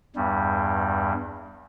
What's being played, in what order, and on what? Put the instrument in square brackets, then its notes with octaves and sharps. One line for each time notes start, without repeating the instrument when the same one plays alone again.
[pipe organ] E2 G2 G3